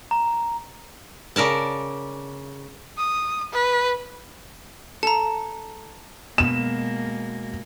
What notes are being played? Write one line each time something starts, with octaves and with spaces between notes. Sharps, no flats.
A#5
C#3 A#4 D5 A5
D#6
B4
A4 A5 A#5
B2 G#3 A#3 E7